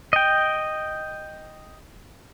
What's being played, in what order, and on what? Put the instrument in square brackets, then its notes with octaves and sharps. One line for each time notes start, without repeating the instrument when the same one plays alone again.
[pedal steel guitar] D#5 G5